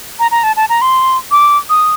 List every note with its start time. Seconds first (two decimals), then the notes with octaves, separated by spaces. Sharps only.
0.19 A#5
0.31 A#5
0.43 A5
0.57 A5
0.69 A#5
0.82 C6
1.31 D6
1.70 D#6